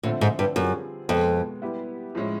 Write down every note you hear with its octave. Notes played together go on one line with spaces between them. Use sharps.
A2 D3 F3 A3 C4
G#2
G2
F#2 G3 C4 F4 G#4
F2 B2 G#3 B3
G3 B3 E4 G4
A2 F3 G#3 C#4 E4